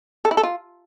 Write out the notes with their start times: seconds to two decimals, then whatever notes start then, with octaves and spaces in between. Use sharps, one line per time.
0.25 A4
0.31 E4
0.37 A4
0.43 F4